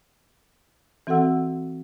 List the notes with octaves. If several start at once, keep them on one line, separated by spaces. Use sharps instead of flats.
E3 C4 F#4 A4 F#5 E6